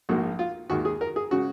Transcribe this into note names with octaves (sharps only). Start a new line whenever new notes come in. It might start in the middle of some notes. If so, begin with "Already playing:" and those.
A#1 G#2 F3 A#3 F#4
F4
D#2 D#3 G#3 F#4
G#4
A#4
G#4
C#3 G#3 F#4